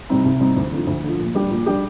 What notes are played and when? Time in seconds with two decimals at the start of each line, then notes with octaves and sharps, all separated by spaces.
0.09 C3 G3 C4 D#4
0.25 C2
0.40 C3 G3 C4 D#4
0.56 D2
0.72 D3 F3
0.87 D2
1.03 D3 F3
1.19 A#2
1.35 G3 D4 G4
1.50 A#2
1.66 G3 D4 G4